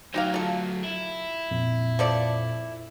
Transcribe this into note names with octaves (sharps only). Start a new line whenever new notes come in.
D2 F#3 D#4 G4 F5
F4 A4
E4
F2 A#2
F3 A4 D5